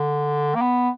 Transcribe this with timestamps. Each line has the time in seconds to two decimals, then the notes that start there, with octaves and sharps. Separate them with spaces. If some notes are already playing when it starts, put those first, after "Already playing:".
Already playing: D3
0.55 A#3
0.61 B3